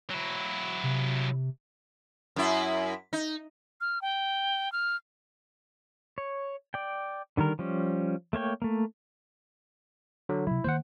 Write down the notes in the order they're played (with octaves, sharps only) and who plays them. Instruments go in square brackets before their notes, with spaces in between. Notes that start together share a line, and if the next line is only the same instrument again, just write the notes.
[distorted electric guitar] F#3 E4
[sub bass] C3
[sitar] F#2 E4
D#4
[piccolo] F6
G5
F6
[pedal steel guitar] C#5
D5 G5
D3 D#3 G3 A#4
F3 G3 C#4
A3 A#3 C#5 G5
A3 A#3
[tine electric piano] D3 F#3
[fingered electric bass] C3 F#3 [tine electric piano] E4
[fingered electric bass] D#3 A#3 [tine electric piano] C5 F#5